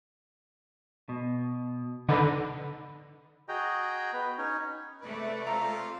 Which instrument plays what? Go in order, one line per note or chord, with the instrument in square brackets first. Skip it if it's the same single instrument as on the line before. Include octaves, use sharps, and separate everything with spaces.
[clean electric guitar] B2
[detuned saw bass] D3 [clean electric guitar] D#4 B4
[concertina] F#4 G#4 D#5 G5 A#5
B3 B4
C#4 D#4 C#5
[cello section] C3 A3 D5 [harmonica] B4
[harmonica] C4 F4 A4 [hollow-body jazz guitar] A#5